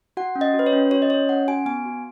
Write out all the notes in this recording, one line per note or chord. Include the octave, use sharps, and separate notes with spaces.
F#4 F#5
C#4
D#5
F#4
B4
C#5
C#4
F#4 C#5
D#5
C#4 C#5
C#4 F#5
F#4 G#5
B3 G#5
F#4